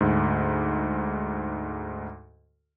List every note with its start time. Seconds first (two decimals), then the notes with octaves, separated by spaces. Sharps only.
0.01 D2 G#2